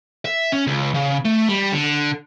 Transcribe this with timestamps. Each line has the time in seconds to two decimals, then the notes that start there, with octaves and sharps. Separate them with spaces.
0.25 E5
0.52 C#4
0.67 C#2
0.94 C#3
1.25 A3
1.49 G3
1.73 D3